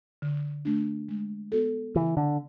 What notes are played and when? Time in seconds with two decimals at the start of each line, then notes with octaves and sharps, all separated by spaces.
0.22 D3
0.65 A3 D4
1.09 G#3
1.52 B3 F#4 A4
1.95 C#3 E3
2.17 D3